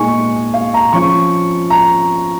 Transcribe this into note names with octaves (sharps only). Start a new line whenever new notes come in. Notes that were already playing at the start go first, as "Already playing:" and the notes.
Already playing: A#2 G#3 D#4 G#5 C#6
F5
A#5
F3 C#4 F4 C#6
A#5